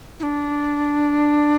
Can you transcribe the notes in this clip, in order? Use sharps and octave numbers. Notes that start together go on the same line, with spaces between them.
E4
D4